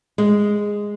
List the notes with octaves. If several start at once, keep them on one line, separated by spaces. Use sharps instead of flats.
G#3